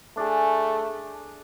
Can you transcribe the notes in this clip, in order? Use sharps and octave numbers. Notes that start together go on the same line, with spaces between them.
A3 D4 G#4